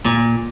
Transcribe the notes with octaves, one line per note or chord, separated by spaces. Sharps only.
A#2